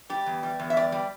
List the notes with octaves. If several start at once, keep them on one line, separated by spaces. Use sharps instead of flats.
G3 G4
E2
G3
E2
E5
G3 D5
G3